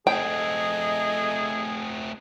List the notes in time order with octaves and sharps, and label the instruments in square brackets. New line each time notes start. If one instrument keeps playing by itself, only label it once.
[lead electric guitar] A3 C4 [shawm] G#4 [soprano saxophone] D#5 [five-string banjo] G5